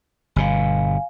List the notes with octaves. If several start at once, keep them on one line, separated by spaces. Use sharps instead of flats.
G1 B2 F5 G#5